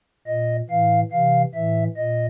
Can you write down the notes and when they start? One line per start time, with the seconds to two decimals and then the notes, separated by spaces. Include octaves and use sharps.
0.27 A#2 D#5
0.70 A2 E3 F5
1.11 C3 E3 F5
1.54 A2 E3 E5
1.97 A#2 D#5